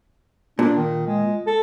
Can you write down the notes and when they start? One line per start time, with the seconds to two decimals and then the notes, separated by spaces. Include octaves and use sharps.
0.59 A#2 D4
0.77 D#3
1.07 G#3
1.47 A4